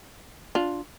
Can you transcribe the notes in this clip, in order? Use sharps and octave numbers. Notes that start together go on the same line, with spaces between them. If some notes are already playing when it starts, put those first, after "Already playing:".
D4 F4